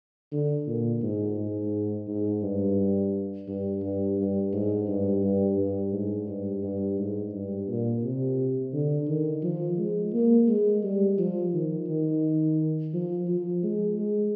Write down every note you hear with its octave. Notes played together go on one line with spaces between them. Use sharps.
D3
A#2
G#2
G#2
G#2
G2
G2
G2
G2
G#2
G2
G2
G2
G#2
G2
G2
G#2
G2
A#2
C3
D3
D#3
F3
G#3
A#3
G#3
G3
F3
D#3
D#3
F3
F3
G#3
G#3